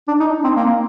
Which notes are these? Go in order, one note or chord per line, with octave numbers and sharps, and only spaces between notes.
D4
D#4
C4
A#3